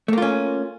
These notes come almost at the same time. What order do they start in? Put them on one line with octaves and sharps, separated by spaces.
A3 A#3 F4 C#4